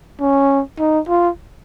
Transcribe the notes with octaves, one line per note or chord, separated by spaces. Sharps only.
C#4
D#4
F4